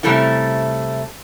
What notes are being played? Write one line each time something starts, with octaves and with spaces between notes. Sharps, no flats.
C3 G3 A3 C#4 E4